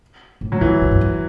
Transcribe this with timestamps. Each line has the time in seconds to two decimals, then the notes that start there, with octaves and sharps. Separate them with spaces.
0.41 A2
0.52 F#3
0.61 A2 E3
0.82 A2
0.91 G2
1.01 F#2